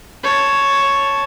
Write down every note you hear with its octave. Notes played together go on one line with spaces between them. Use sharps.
C#5 A5